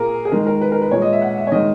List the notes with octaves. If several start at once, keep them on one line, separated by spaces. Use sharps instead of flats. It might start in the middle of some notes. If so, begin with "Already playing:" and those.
Already playing: A#2 A#3 G#4 A#4
G#4
D#3 G#3 A#4
A#4
B4
A#4
B4
A#2 G#3 C#5
D#5
E5
F#5
E5
C#5
D#3 G#3 D#5